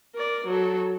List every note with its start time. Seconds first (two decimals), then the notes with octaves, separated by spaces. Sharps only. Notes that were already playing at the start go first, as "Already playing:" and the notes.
0.15 A#4 D5
0.47 F#3 A4